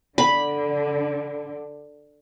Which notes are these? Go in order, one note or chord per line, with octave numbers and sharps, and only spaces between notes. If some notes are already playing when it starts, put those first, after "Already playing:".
D3 B5